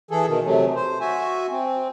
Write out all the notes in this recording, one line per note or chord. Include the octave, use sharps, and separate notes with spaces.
E3 G#4 A4
B2 D#3
C3 F#3 A3
C5
F#4 E5 G#5
C4